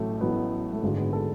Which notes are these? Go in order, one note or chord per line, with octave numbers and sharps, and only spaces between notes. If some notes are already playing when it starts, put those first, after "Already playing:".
Already playing: A1 A2 F#3 A3
A1 A2 F#3 B3
A3
G#1 F#2 D3 F#3 G#3
B3
A4